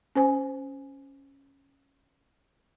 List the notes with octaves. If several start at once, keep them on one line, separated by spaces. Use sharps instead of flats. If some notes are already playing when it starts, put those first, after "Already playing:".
C#4 C5 G#5